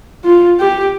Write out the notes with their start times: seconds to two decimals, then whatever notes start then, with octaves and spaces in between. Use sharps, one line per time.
0.25 F4
0.60 G4